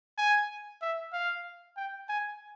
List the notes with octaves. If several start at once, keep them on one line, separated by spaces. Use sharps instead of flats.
G#5
E5
F5
G5
G#5